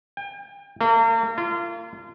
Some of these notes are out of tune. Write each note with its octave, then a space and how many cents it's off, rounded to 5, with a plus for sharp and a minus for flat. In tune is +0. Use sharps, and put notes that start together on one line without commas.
G5 +40
A#3 -40
F4 -30